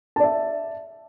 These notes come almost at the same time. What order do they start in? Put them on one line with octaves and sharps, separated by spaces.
A5 D5 E5